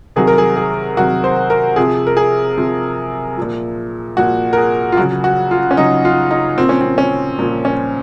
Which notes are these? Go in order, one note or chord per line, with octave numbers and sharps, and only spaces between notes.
C3 D#3 F#3 G#4
A#4
G#4
G#4
C3 D#3 F#3 F#4
C5
A#4
C3 F3 G#4
A#4
G#4
C3 F3
A#2 F3
A#2 F3 F#4
A#4
G#4
F4
C#3 F#3 F#4
F#4
F4
C#4
C#3 F#3 D#4
F4
D#4
A#2 F3 C4
C#4
C4
C#4
A#2 F3
C#4